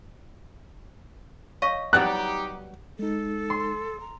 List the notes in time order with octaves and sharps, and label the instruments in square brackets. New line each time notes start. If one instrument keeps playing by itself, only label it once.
[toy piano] C#5 F5 C#6 [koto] D#5
[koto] F#3 G3 B3 [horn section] D#4 G4 [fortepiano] F#6
[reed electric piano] G#3 D#4 [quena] A4
[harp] C6
[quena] A#5